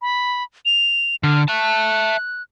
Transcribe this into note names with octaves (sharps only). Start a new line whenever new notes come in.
B5
F7
D3 F6
E5 A5 F#6